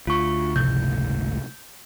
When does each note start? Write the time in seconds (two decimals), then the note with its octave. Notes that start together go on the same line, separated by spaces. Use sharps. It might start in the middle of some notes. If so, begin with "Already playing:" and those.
0.07 D2 F4 C#6
0.56 G1 C#2 A2 C3 F3 A3 G6